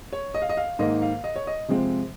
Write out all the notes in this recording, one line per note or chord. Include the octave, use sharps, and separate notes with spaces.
C#5
D#5
F5
D#5
F5
G#2 D#3 A#3 D#5
F5
D#5
C#5
D#5
C3 F3 G#3 C4